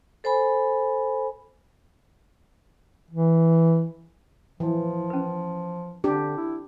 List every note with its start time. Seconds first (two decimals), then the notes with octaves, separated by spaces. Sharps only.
0.24 A4 C5 G#5 B5
3.11 E3
4.60 E3 F3
5.10 C#4 B4
6.04 D3 D4 G4
6.37 E4